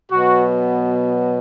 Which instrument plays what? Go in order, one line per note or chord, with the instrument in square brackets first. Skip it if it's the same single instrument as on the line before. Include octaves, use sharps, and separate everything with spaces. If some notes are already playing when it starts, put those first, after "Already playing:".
[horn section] B2 F#3 B3 F#4